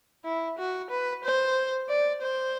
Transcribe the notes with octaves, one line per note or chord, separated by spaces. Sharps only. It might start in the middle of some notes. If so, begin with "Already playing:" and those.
E4
F#4
B4
C5
D5
C5